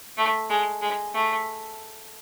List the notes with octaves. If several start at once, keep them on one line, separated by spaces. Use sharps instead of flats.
A3
G#3
G#3
A3